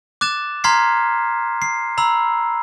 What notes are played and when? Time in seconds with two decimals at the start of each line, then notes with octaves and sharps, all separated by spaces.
0.21 D6 F#6 A6 E7
0.64 A#5 C6 F6 G#6 B6 C7
1.62 C7
1.98 A#5 B5 E6